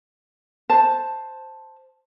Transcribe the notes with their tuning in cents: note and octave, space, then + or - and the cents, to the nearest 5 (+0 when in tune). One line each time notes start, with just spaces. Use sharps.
C5 +0 A5 +0